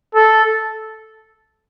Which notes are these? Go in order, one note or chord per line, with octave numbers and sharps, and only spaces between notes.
A4